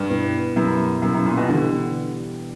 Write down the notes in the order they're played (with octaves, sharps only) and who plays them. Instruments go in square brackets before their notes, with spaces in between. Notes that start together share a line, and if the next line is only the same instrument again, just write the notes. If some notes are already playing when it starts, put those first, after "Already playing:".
Already playing: [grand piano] G2
[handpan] B2 G3 B3 E4 B4
[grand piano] F#2 [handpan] B2 G3 B3 E4 B4
[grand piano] F#2 [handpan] B2 G3 B3 E4 B4
[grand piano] F#2
A#2
B2
[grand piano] D3 [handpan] E3 G3 B3 D4 G4